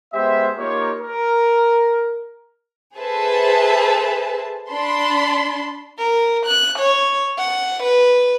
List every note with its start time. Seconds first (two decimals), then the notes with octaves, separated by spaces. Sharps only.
0.13 G#3 B3 G4 C5 E5
0.58 A#3 D#4 F4 G4 A#4 C#5
1.01 A#4
2.97 G#4 A4 B4 C5 E5 A5
4.70 D4 A5 B5 C6
5.98 A#4
6.46 F#6
6.79 C#5
7.38 F#5
7.83 B4